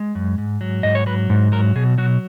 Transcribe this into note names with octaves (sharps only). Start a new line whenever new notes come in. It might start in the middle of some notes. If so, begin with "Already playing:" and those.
Already playing: G#3
F#2
G#2
F#3
G#2 D#5
C#5
F#3 B4
G#2
F#3 A#4
B2 G#4
F#3 F#4